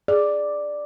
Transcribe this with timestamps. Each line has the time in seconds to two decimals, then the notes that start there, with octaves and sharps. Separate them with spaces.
0.08 G#4 D5